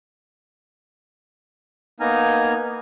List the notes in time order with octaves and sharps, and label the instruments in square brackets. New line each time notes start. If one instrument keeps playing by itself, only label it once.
[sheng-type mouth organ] A#3 B3 D#4 G#5 A#5 F6